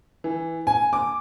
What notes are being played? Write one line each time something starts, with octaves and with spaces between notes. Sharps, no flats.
E3
G#5
D6